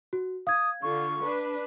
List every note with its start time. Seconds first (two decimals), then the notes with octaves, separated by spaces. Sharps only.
0.13 F#4
0.47 F5 D#6 G#6
0.83 D3 F4 C#6
1.25 D4 B4